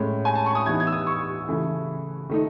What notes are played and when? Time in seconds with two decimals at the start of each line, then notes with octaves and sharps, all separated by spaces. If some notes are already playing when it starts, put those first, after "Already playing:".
Already playing: A2 G#3 C#4
0.25 G#5
0.35 A5
0.46 C#6
0.55 D#6
0.66 E3 B3 D#4 G#6
0.80 G#6
0.87 E6
0.93 D#6
1.07 C#6
1.48 C#3 E3 A3 E4
2.30 D#3 A3 D#4